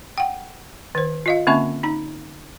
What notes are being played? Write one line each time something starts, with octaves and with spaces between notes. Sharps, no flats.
F#5 G5
D#3 C5
F4 D#5 F5
D3 A#3 C4 C#4 E5 C#6
D#4 A#5